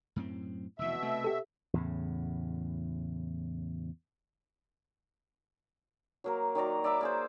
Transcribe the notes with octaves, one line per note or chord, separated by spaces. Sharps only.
F#2 A2 C4
F1 B2 E3 E5
C3 A3
G4 A4
E2 A2 C#3
F#3 A#3 A#4
D#3 F#3 D5 A#5
D5 E5 B5 D6
A#3 G#4 C5